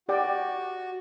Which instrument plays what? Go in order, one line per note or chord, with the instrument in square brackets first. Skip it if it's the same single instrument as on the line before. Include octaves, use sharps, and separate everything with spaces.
[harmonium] F#4 [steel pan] G4 D5 G5